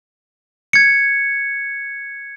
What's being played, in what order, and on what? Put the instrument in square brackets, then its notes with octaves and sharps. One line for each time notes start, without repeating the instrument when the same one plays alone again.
[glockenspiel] G#6 C#7